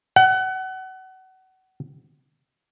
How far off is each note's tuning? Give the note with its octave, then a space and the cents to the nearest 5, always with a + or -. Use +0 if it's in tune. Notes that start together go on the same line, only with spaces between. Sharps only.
F#5 +30